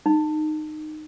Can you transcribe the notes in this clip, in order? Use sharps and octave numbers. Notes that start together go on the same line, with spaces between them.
D#4